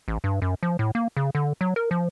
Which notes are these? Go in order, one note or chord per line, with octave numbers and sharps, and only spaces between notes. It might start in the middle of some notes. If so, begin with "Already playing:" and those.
A1
G2
F#2
F3
A2
A#3
C#3
D3
F#3
A#4
F3